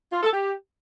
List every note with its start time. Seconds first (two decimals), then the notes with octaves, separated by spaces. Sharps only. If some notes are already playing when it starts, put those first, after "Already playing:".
0.12 F4
0.23 A4
0.33 G4